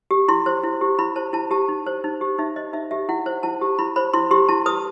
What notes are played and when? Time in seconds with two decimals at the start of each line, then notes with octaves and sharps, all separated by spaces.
0.11 G4
0.28 E4 C6
0.46 C5
0.63 E4
0.81 G4
0.99 E4 B5
1.16 C5 A5
1.33 E4 A5
1.51 G4 A5
1.68 D#4
1.86 C5
2.04 D#4
2.21 G4
2.38 D#4 E5
2.56 C5 D#5
2.73 D#4 E5
2.91 G4 E5
3.09 E4 F#5
3.26 C5
3.43 E4 A5
3.61 G4
3.79 E4 B5
3.96 C5 B5
4.14 E4 C6
4.31 G4 C6
4.49 E4 A5
4.66 B4 D#6